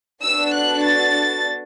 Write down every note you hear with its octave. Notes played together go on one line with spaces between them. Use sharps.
B3 D4 F#4 A4 E6
F#6
A6